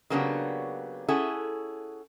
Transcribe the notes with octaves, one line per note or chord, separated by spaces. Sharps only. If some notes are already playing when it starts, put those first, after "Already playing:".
C#3 F#3 A#3 B3 D4 G4
C#4 E4 G#4 A4 F#5